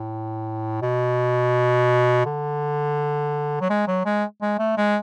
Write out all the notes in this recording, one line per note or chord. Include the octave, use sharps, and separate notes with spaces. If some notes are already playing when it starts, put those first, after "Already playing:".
Already playing: A2
B2
D3
F#3
G#3
F#3
G#3
G#3
A3
G#3